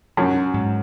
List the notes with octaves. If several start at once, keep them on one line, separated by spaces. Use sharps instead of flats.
F#2 F#3
G#2